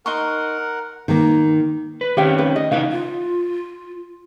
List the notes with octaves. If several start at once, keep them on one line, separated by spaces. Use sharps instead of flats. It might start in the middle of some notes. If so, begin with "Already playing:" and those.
D#4 A#4 F#5 C6 C#6
D#3 A#3
B4
D#3 C4 C#4 G4 F5 G5
B4
D#5
C#3 E3 D#4 B4 F5
F4